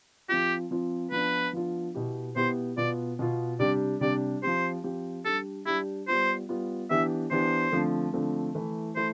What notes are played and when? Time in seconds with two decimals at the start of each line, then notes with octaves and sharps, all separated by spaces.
0.29 F3 C4 F4 G4
0.71 F3 C4 F4
1.12 F3 B3 D4 F4 B4
1.53 F3 B3 D4 F4
1.95 B2 B3 E4 G4
2.36 B2 B3 E4 G4 C5
2.77 B2 B3 F4 D5
3.19 B2 B3 F4
3.60 C3 G3 D4 G4 D5
4.01 C3 G3 D4 G4 D5
4.43 F3 C4 G4 C5
4.84 F3 C4 G4
5.25 G3 D4 G4 A4
5.66 G3 D4 E4 G4
6.08 G3 B3 F4 C5
6.49 G3 B3 F4
6.90 E3 B3 D4 G4 E5
7.31 E3 B3 D4 G4 C5
7.72 D3 F3 A3 C4
8.14 D3 F3 A3 C4
8.55 E3 A3 E4
8.96 E3 A3 E4 C5